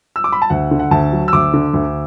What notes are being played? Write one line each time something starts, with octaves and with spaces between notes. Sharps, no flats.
E6
D6
B5
A5
D2 F#5
D3
F#5
D2 A5
F#3
E6
D2 D6
D3
D2